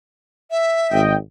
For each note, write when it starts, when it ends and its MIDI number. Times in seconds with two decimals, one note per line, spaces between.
0.50 1.01 76
0.91 1.15 32
0.91 1.15 75
0.91 1.15 79